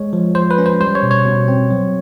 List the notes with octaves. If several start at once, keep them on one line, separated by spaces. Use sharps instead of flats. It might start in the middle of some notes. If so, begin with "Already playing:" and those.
Already playing: G#3 C#5
F3
F3 C5
B4
C#4
C5
G3 C5
C#5
B2
C#5
B2
C4
F#3